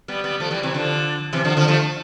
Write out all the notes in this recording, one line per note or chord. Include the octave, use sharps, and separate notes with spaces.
G3 B3
G3 B3
F3 A3
E3 G3
C3 E3
D3 F3
C3 E3
D3 F3
D3 F3
F3 A3